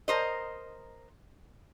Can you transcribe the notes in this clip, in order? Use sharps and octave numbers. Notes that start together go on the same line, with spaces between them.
A#4 C5 D#5